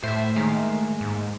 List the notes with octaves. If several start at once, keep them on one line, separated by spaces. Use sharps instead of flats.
A2 A3 C5 E5
D#3 G#3 A#3
G#2